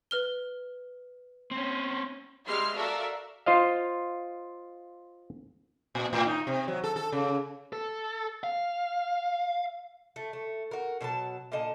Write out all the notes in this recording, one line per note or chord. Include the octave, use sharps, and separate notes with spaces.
B4 F6 G7
C4 C#4
G3 G#3 E5 C6 F6 C7
F#4 A4 A#4 D5 E5 F5
F4 C5 D#5 F5
A#2
A2
D#4
C3
F#3
A4
A4
C#3
A4
F5
A3
A3
F#4 A#4
B2 F#3 G#4 A5
A#2 D3 D#5 A5